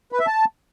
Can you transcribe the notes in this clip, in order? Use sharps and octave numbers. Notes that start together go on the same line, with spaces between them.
B4
E5
A5